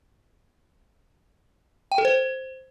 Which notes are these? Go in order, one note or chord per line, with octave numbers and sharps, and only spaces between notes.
G5
A4
C5